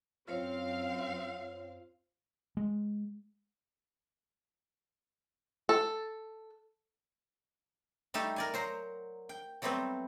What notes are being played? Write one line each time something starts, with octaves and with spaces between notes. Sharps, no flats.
F#2 C4 F4 C5 C#5 F5
G#3
A4
G3 A3 D#4 G4 A4
A#4 D5 G#5
F#3 C5 A#5
G5
F#3 G3 A3 B3 C4